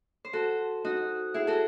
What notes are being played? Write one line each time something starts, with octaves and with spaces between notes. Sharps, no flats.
C5
F#4 A4
D#4 F#4
E4 G#4
F#4 A4